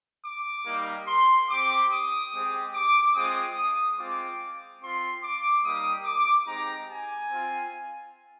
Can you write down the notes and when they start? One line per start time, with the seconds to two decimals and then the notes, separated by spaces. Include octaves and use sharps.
0.24 D6
0.66 G3 A#3 D#4 G4
1.07 C6
1.49 C4 G4 D6
1.91 D#6
2.32 G#3 C4 G4
2.73 D6
3.14 G#3 C4 F4 D#6
3.97 G#3 C4 F4 D6
4.80 C4 F4 C6
5.22 D6
5.63 G3 A#3 D#4 G4 D#6
6.04 D6
6.46 G#3 C4 D#4 G4 A#5
6.88 G#5
7.30 C4 F4